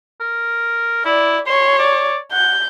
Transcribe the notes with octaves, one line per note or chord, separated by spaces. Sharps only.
A#4
E4 D5
C#5 C6
D5
F#5 G6